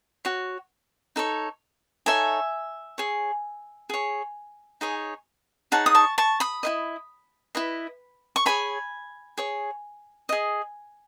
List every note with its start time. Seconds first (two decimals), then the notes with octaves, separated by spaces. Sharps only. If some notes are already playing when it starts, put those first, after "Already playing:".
0.25 F#4 C#5
1.16 D#4 A4 C#5
2.06 D#4 A4 C#5 E5 G#5
2.98 G#4 C#5
3.90 G#4 C#5
4.81 D#4 G#4 C#5
5.72 D#4 G#4 C#5 F#5 A5
5.86 D#6
5.95 A5 C#6
6.18 A5 C#6
6.40 B5 D#6
6.63 E4 B4 D#5
7.55 E4 B4 D#5
8.36 C#6
8.46 G#4 C#5 G#5 B5
9.38 G#4 C#5
10.29 G#4 D#5